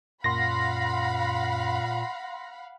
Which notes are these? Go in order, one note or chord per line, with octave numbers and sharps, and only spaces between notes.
F#2 A#2 F5 F#5 B5 C6 A#6